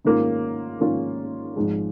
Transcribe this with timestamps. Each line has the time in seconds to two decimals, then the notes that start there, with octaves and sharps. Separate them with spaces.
0.05 G#2 D#3 A#3 C#4 F4
0.80 G#2 D#3 A#3 C#4 F4
1.56 G#1 G#2 F3 G#3